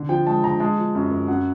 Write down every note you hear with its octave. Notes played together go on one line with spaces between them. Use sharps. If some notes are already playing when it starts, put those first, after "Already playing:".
Already playing: D3
F3 G5
G#3 A5
D3 A#5
G#3 A5
F3
F#2
F#2
F#2 F#5